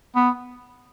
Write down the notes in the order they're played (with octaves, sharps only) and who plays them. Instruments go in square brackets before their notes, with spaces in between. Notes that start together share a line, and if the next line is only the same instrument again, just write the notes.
[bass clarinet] B3